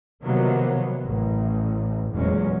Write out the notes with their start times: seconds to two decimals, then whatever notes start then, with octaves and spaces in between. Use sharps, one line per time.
0.22 C3 D#3 F3 F#3 A#3 B3
1.05 A1
2.11 F1 E2 A#2 F#3 G#3 C#4